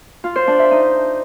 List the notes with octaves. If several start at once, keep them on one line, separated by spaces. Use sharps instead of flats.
F4
C5
D4
E5
D#4